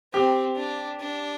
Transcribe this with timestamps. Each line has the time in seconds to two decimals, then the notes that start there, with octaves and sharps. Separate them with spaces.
0.13 C4 G4
0.56 D4
1.00 D4